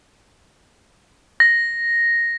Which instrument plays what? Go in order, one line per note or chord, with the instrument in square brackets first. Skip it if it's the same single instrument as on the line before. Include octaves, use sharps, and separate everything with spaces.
[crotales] A#6